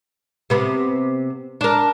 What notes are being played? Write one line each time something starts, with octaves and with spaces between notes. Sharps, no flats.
C3 B3
D4 A#4